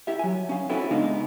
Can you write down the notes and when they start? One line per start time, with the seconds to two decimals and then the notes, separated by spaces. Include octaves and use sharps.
0.07 E4 G4 E5
0.19 F#3 G#5
0.49 C#4 F5
0.69 C4 C#4 E4 F#4 A4 B4
0.91 C#3 G#3 B3 D4 D#4 F5